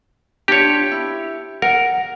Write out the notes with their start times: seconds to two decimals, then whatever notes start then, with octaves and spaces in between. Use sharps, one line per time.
0.48 D4 F4 G4 C#5
0.92 E4
1.62 A#4 F#5